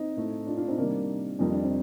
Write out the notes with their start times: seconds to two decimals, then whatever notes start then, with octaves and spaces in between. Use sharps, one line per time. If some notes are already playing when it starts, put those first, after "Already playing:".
Already playing: C4 D#4
0.16 A2 A3
0.47 D4 F4
0.57 D4 F4
0.68 C4 D#4
0.77 C3 D#3 G3 A#3 D4
1.39 F2 D#3 G3 D#4
1.52 D4
1.64 C4